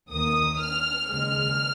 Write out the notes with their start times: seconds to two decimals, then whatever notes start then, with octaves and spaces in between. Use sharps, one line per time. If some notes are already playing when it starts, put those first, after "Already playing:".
0.11 D#2 D#3 A#3 D#6
0.60 F6
1.09 D#2 C#3 G#3 F6